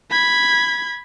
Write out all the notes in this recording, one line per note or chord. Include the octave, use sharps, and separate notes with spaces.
B5 G#6